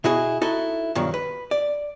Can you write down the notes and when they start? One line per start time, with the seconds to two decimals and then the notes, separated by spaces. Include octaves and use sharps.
0.04 B2 E4 F#4 G#4
0.41 D#4 E4 F#4 A4
0.95 G2 B2 D#3 F3 F#3
1.14 B4
1.51 D5